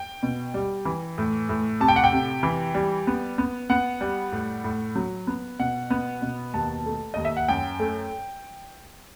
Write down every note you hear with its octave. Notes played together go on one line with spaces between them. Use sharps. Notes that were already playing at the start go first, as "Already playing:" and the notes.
Already playing: G5
B2
G3
E3
A2
A2
C3 A5
G5
F#5
G5
C3
E3
G3
B3
B3
B3 F#5
G3
A2
A2
F#3
B3
B2 F#5
B3
B2
D#2 A5
A3
D#2 D#5
E5
F#5
F#2 G5
A3